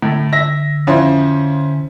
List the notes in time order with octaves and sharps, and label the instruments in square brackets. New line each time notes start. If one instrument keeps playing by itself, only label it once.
[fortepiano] A2 A3 [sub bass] D3
[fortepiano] E5 [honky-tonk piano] A#6
[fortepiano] F2 [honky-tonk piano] C#4 E4 C5